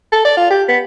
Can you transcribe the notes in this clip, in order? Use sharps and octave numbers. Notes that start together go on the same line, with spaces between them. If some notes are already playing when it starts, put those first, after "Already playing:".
A4
D5
F4
G4
B3